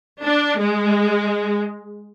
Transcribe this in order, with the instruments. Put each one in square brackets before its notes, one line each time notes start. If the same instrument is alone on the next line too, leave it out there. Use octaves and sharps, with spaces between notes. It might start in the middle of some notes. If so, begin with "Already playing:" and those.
[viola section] D4
G#3